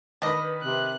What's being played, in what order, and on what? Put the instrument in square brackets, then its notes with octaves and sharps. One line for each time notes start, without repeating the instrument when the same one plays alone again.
[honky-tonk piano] D#3 B4 B5 [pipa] D4 D#5
[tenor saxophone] C3 [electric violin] F#6